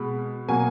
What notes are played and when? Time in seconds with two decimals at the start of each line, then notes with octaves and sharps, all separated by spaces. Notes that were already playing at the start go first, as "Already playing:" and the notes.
Already playing: B2 G#3 B5
0.48 B2 F#3 A#3 G#5